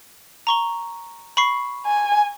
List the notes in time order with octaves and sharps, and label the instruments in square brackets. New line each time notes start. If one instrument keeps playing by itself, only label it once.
[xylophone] A#5 C#6 G7
B5 C#6 C7
[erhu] G#5